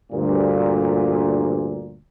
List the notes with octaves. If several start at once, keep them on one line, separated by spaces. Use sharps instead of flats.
D2 G2 A#2